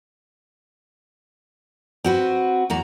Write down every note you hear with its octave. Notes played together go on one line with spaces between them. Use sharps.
C4 F#4 B4
E2 F#4 A#5